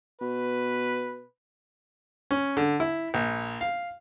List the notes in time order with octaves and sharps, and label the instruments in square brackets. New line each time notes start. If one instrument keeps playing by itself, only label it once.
[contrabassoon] B2 [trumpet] B4
[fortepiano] C#4
D3
E4
A#1
F5